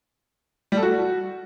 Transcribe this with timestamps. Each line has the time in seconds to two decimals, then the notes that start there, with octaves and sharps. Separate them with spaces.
0.72 G3
0.77 A4
0.83 F#4